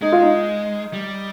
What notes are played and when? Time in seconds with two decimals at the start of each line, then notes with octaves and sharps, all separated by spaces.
0.01 G#3 D#4
0.12 F4
0.22 D#4
0.93 G3